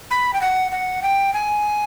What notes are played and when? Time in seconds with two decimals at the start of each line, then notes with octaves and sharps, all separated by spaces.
0.11 B5
0.33 G5
0.41 F#5
0.72 F#5
1.03 G5
1.33 G#5